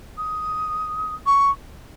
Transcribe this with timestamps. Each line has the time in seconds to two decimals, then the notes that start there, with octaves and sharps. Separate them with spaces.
0.18 D#6
1.26 C#6